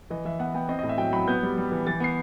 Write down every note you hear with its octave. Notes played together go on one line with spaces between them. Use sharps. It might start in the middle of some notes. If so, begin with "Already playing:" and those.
E3 D#5
E3 E5
B3 F#5
B3 G5
C4 D#5
A2 D#5
E5
F#3 G5
F#3 B5
B3 G6
G3
G3
E3
E3 A6
B3 C7